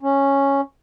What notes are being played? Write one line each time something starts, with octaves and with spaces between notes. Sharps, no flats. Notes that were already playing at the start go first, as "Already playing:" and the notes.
C#4